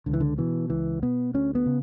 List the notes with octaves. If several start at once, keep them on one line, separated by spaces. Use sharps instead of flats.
C#2 D3
E3
D3
B2 E3
C#2 E3
B2 B3
D2 C#4
B3
C#3